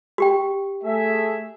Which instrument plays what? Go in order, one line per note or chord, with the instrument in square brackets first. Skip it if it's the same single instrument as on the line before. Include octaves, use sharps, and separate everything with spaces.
[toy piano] F#4 G4 G5
[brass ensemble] A3 G#4 E5